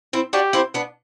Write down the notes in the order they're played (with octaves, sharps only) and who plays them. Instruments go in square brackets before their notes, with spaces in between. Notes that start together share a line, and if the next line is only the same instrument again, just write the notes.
[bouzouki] C4 E4
[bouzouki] D4 F#4 [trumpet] G4
[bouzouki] C4 E4
B3 D4